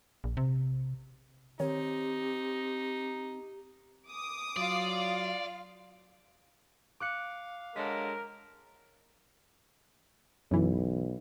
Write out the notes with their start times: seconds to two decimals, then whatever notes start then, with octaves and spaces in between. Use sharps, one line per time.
0.24 A#1
0.37 C3
1.60 D#3 C4 D#4 G4 C#5
4.08 D6 D#6
4.57 F#3 F4 D5 F5
7.00 F5 D6 F#6 C#7
7.76 D3 F#3 G#3 A#4 B6
10.51 B1 F#2 E3